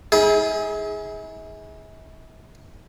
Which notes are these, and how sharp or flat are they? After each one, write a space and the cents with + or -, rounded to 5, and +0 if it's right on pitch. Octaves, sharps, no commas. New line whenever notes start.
E4 -45 G#4 +0